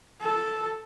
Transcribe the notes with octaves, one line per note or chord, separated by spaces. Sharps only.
A4